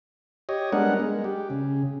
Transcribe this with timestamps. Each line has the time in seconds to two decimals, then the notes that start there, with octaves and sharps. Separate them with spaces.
0.49 G4 C#5 D#5
0.72 G3 G#3 B3 D4 A#4 F#5
1.00 G#3
1.24 G4
1.50 C#3